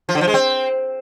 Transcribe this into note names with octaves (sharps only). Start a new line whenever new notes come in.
F3
D3
F3
G#3
C4